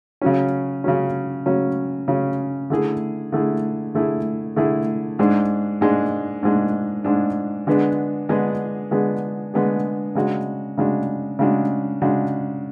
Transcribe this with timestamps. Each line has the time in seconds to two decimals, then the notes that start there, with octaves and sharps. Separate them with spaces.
0.21 C#3 F#3 C#4
0.84 C#3 F#3 C#4
1.46 C#3 F#3 C#4
2.08 C#3 F#3 C#4
2.70 D3 A3 E4 G#4
3.32 D3 A3 E4 G#4
3.94 D3 A3 E4 G#4
4.56 D3 A3 E4 G#4
5.19 G#2 G#3 D4
5.81 G#2 G#3 D4
6.43 G#2 G#3 D4
7.04 G#2 G#3 D4
7.67 D3 G#3 B3 D4 G#4
8.29 D3 G#3 B3 D4 G#4
8.91 D3 G#3 B3 D4 G#4
9.54 D3 G#3 B3 D4 G#4
10.15 C#3 G#3 D4 F#4
10.78 C#3 G#3 D4 F#4
11.39 C#3 G#3 D4 F#4
12.02 C#3 G#3 D4 F#4